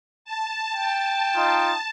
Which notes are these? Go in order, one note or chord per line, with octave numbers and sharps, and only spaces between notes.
A5
G5
D#4 F4